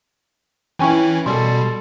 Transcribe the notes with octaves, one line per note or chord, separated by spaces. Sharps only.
E3 C#4 E4 G5 G#5 C#6
B2 G3 A4 C6